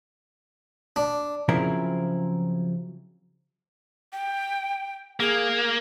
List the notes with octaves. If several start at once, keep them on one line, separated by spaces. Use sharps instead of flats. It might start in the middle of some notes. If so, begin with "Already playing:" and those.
D4
C#3 F3 F#3 C4 E4 A#4
G5
A#3 G#4